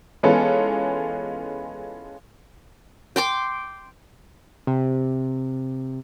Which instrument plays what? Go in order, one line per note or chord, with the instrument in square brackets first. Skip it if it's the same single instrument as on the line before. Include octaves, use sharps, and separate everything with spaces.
[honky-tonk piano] E3 G#3 B3 C#4 F4 A4
[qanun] G5 C6 D6
[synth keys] C3